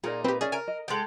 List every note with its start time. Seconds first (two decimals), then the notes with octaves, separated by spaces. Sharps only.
0.04 A#2 D#4 G#4 A#4 D5
0.24 C4 G4 B4
0.41 C#4 G#4 D5 E5
0.52 A#4 G#5 D7
0.68 D#5
0.88 G#3 A4 G5